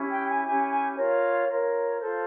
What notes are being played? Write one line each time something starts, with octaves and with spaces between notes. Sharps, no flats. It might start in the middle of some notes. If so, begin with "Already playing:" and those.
Already playing: C#4 E4 G4
G5
G#5
C#4 E4 G4 G#5
G#5
F4 A#4 C#5
F4 A#4 C#5
F4 A4 C5